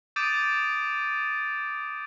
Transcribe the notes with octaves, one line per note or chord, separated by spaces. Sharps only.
D6 D#6 G6 A6 D7 D#7